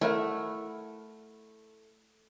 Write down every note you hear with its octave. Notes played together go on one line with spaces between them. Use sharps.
A3 E4 A#4 F#5